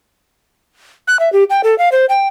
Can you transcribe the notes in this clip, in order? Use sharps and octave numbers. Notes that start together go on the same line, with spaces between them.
F#6
E5
G4
G5
A4
F5
C5
G5